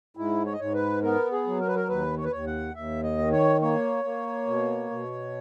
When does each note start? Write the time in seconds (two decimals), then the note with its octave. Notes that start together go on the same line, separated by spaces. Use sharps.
0.17 G#2 E4
0.46 C#5
0.53 D#5
0.60 G#2 C#5
0.74 B4
1.02 B3 A#4
1.32 G#4
1.46 F#3
1.60 A#4
1.68 B4
1.76 A#4
1.88 D#2 B4
2.18 C#5
2.25 B4
2.32 D#2 C#5
2.47 F#5
2.75 D#2 E5
3.03 D#5
3.18 D#3
3.32 C#5
3.61 A#3 C#5
4.05 A#3
4.47 B2
4.91 B2